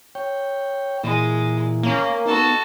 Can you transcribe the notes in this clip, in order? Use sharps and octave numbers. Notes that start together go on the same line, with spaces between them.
C#5 G5
A#2 E3 G#3
A#3 C#4
B3 D#4 F#4 A4